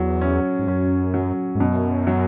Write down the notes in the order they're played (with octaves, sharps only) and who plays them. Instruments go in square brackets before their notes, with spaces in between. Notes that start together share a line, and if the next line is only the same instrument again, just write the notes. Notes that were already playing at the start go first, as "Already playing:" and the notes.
Already playing: [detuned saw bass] E2 [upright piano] F#3
[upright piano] C#4
[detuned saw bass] G#2
[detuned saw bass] F#2 [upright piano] C#4
[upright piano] F#3
[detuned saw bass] G#2
[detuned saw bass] F#2 [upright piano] B2
[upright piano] F#3